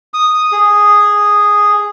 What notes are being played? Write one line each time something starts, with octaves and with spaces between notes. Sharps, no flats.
D#6
G#4